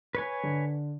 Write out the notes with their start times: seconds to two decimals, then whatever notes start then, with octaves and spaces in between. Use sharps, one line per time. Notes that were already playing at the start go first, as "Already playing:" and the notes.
0.15 B4 C#5 G#5
0.43 D3